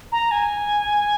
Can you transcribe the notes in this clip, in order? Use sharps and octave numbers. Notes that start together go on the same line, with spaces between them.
A#5
G#5